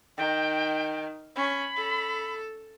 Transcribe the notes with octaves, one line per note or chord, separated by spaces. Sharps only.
D#3 G5
C#4 B5
A4